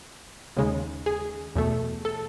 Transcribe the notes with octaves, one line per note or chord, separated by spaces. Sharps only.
D#2 C#3 G#3
G#4
E2 B2 A3
A4